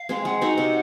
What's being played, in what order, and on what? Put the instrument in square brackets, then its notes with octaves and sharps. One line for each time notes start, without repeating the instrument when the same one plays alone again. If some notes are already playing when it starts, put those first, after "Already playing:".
Already playing: [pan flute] F5
[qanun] G#3 C4
[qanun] G#3 [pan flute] F#5
[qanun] C4 D#4 F#4 [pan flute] F#5
[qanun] C3